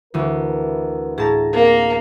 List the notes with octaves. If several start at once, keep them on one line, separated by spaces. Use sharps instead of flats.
D2 E3 A#4 B4
A2 E4 G#4 A5 A#5
A#3 C4 A#4